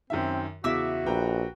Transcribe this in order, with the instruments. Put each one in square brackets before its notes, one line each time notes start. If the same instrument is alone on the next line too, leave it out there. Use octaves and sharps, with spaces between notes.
[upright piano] F#2 D#3 E5 [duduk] C4
[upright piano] E2 C#3 [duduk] F#4 [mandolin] E5 D6 E6
[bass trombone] A#1 [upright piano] B4 G5 A#5